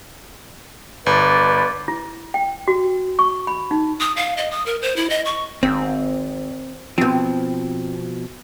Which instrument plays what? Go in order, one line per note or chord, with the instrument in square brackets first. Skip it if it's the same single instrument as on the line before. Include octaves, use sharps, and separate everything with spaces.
[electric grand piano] G1 [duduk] B4 [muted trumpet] D5
[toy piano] E4
G5
F#4
C#6
B5
D#4
[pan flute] D#6
F5
D#5
D#6
A#4
C5
E4
D#5
C#6
[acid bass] G#1 [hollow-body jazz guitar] C4
[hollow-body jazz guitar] B2 F3 [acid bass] C4